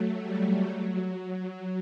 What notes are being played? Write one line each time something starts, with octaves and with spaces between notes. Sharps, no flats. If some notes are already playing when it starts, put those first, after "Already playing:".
Already playing: F#3 A3
G3
F#3
F#3